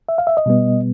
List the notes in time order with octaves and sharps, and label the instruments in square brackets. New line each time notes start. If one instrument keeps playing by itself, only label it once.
[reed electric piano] E5
F5
E5
D#5
B2 G3 B3